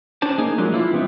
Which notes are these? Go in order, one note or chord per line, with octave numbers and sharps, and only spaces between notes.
C#4 D4 C5 A5
A#3 D#4 G#4
F3 F#3 G#3 A#3 D4
E3 E4 F4
G3 B3 C4 D4 D#4